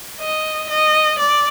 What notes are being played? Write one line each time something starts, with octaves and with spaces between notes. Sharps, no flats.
D#5
D#5
D5